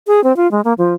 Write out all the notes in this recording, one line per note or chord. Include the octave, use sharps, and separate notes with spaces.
G#4
C4
F4
G#3
A#3
F3